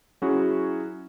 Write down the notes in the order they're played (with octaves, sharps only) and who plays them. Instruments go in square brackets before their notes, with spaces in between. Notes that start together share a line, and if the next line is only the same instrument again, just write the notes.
[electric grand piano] F#3 C#4 E4 F#4 G#4